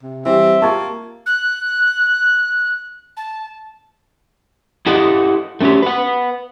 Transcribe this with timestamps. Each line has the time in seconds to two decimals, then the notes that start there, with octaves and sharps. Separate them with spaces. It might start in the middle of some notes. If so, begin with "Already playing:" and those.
0.03 C3
0.25 E3 G3 C4 E5
0.62 A#3 F4 G4 A5 C#6 G#6
1.26 F#6
3.17 A5
4.86 E4 G4 A4 D#5 F5 F#5
5.61 A3 C4 C#4 F#4 G4
5.82 B4 F#5